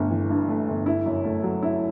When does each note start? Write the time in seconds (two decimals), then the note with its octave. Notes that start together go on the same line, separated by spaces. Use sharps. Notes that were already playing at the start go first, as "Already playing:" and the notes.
Already playing: G1 A3
0.11 E3
0.30 G2
0.49 A3
0.68 G1
0.86 E4
1.06 F#2
1.24 A3
1.43 F#3
1.63 E4